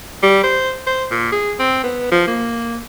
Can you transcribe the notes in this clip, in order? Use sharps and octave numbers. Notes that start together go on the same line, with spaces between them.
G3
C5
C5
A#2
G#4
C4
B3
F3
A#3